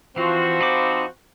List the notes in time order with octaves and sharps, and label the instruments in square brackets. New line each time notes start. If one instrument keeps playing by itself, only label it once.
[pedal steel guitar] E3 F4 [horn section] F3 C4 F#4
[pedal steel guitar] D#4 B5 D6